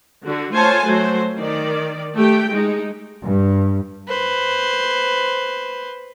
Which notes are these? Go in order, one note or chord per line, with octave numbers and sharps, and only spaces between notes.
D3 F#4
A3 F4 C5 C#5 G#5 A5
F#3 A3 F#4 C5
D#3 D5
A3 G4 G5
G#3 D#4
G2
B4 C5